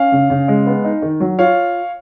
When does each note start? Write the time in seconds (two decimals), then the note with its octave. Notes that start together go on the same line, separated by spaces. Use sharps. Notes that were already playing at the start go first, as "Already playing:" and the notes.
Already playing: C#4 F5 G#5
0.12 C#3
0.30 C#3
0.48 G#3
0.66 B3
0.85 D#4
1.02 D#3
1.20 F#3
1.38 F4 C#5 F5